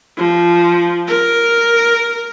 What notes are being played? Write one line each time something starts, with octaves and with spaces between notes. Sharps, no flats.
F3
A#4